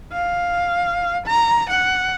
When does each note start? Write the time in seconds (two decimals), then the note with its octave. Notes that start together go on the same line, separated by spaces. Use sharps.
0.12 F5
1.27 A#5
1.70 F#5